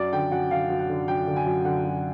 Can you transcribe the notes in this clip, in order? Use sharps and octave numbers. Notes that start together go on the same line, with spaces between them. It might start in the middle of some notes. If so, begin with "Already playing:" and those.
Already playing: F#2 D5
D3 G5
F#2 F#5
D3 F5
F#2
F#5
D3
F#2 G5
D3
G#5
F#2
D3 F#5
F#2